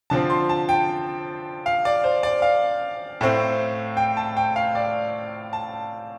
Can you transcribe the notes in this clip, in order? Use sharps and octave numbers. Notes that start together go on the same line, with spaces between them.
D3 F3 C4 A5
C6
A5
G5
F5
D5
C5
D5
F5
A2 A3 C4
G5
A5
G5
F5
D5
A5